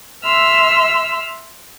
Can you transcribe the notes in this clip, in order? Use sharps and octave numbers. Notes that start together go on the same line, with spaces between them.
E5 C6 E6 F6